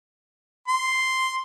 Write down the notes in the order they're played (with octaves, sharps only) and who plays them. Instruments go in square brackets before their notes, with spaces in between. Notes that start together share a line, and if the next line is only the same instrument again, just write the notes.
[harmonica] C6